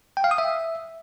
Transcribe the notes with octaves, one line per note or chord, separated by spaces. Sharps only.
G5
F5
D#6
E5